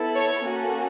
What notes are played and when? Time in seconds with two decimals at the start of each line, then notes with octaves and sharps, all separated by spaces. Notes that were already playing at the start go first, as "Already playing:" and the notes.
Already playing: B3 E4 A4
0.15 C#5
0.43 A#3 C#4 F#4 A4